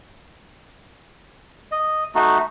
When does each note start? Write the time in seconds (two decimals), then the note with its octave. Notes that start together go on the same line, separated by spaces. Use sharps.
1.72 D#5
2.15 A3 D#4 F#4